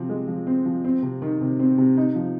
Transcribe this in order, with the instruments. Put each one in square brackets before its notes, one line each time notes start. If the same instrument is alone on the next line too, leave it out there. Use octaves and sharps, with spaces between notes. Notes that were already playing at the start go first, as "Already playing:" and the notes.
Already playing: [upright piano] C3 F3 C4
G#3
F3
C4
F3
C4
C3
D#3
C3
C4
C3
D#4
F3